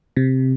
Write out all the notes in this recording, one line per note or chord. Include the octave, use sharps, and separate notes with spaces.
C3